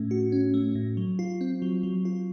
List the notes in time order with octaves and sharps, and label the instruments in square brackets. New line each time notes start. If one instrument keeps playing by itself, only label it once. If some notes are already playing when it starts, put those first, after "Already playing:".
Already playing: [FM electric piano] A2 A3 C#4
F#4
C#4
A3
A2
F#3
F4
C4
F#3
F#3
F4